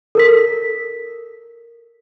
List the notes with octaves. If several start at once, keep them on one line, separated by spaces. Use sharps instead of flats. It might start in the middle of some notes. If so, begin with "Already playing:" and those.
A4 A#4 B6